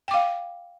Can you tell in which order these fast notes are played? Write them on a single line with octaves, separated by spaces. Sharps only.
G5 D6 F5